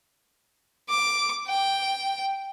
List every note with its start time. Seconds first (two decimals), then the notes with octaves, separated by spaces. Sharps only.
0.89 D6
1.47 G5